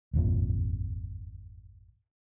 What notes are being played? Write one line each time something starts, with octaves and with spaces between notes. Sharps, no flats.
D#1 G#1 F2 A#2